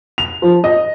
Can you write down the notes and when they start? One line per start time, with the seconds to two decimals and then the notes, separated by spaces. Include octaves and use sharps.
0.18 F7
0.42 F3
0.64 D#5